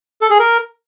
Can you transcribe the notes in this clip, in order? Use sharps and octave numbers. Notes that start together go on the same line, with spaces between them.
A4
G#4
A#4